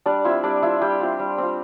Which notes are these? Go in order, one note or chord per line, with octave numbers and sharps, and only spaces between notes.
G3 D4 D5
C4 E4 F4 E5
G3 D4 D5
C4 E4 F4 E5
G3 G4 G5
C4 F4
G3
C4 F4